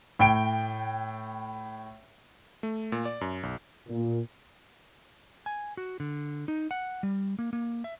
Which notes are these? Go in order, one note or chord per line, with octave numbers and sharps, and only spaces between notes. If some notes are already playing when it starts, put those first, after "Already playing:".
A2 G5 D7
A3
A#2
D5
F#2
B1
A#2
G#5
F#4
D3
D#4
F#5
G3
A#3
A#3
E5